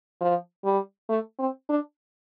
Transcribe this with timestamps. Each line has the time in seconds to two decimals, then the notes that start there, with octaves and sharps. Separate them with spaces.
0.21 F3
0.65 G3
1.09 A3
1.39 C4
1.69 D4